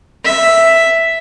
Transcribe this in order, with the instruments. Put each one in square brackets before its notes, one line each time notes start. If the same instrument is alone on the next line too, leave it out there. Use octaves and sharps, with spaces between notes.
[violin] E5